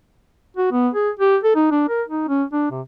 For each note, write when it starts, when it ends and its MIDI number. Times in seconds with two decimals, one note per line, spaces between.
0.57 0.71 66
0.72 0.89 59
0.94 1.10 68
1.19 1.37 67
1.43 1.55 69
1.56 1.70 63
1.71 1.89 62
1.89 2.03 70
2.08 2.28 63
2.29 2.44 61
2.53 2.71 62
2.71 2.81 48